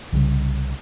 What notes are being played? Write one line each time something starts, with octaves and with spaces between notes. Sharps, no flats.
C2 C#3 E3 G3